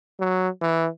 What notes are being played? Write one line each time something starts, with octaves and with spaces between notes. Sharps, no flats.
F#3
E3